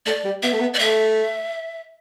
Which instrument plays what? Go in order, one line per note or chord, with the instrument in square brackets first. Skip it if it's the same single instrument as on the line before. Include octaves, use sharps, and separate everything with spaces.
[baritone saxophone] A3 [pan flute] D5
[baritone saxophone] G3
[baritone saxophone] B3 [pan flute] E5
[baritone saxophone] A3
B3
[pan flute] D5
[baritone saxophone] A3 [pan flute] E5